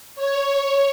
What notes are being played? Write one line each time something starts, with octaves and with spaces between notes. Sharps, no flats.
C#5